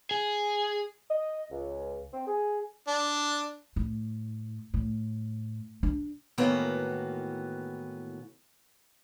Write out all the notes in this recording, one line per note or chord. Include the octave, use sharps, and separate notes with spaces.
G#4
D#5
C#2
C4
G#4
D4
A2
A2
D4
A2 D#3 E3 A#3 B3 F#4